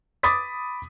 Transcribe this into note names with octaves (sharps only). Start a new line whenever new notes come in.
B5 D6 D#6 A6 B6